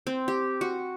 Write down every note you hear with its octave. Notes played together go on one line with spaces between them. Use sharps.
C4
G4
F#4